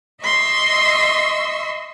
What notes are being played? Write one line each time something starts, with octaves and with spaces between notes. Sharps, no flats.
D#5 E5 C6 C#6 E6